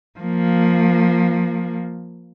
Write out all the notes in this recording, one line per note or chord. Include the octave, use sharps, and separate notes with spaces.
F3 A#3